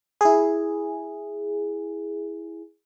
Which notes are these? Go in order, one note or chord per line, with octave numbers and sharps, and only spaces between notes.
E4 G#4